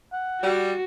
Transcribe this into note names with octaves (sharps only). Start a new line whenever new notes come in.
F#5
G3 F#4